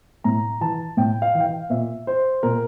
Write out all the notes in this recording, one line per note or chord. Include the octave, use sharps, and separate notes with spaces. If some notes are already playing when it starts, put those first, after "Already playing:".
A2 A#5
E3 A5
A2 G5
F5
E3
G5
F5
A#2 E5
C5
A#2 A#4